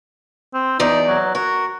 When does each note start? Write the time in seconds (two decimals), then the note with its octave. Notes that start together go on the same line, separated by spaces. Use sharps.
0.54 C4
0.80 E2 D#4 D5
1.08 F#3
1.35 F#4 A#4